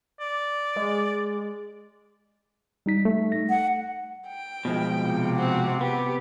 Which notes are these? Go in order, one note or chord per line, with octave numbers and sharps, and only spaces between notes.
D5
G#3
G3 D#4 B6
A3
A#6
F#5
G5
B2 F3 G#3
C3
C4 F#4
B3 G4